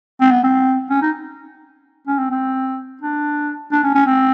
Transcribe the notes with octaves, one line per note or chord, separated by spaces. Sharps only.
C4
B3
C4
C#4
D#4
C#4
C4
C4
D4
D4
C#4
C#4
C4